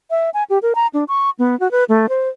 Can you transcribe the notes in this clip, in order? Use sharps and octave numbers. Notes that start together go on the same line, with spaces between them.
E5
G#5
G4
A#4
A#5
D4
C#6
B3
F#4
B4
A3
C5